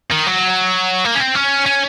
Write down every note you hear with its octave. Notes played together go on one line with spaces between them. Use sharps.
D#3
F#3
A#3
C#4
C4
C#4
C#4